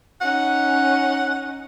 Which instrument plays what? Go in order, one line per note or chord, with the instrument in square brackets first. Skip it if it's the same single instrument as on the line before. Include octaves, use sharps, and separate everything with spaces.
[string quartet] C#4 D#4 [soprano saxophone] F#5